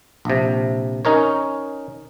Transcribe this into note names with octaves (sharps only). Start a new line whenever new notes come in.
A#1 C3
C#4 D#4 A#4 C#5